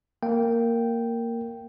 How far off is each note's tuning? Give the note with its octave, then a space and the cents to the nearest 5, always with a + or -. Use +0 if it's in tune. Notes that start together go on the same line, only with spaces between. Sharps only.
A#3 -10 G5 -5